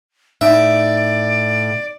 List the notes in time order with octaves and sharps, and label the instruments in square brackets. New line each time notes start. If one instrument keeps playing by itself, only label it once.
[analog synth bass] A2 [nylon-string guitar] D#4 [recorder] D5 [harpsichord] E5